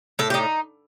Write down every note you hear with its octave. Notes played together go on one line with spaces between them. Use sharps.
A2 A4
G4
D#4